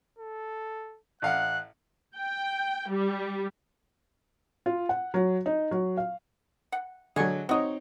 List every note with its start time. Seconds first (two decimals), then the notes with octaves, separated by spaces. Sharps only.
0.19 A4
1.22 A1 F5 F#5 F#6
2.17 G5
2.90 G3
4.66 F4
4.89 F#5
5.14 F#3
5.46 D#4
5.71 F#3
5.97 F5
6.72 F#5
7.16 D3 F#3 G#3 G#5 C#6
7.49 C4 D#4 F#4 C#5 D#5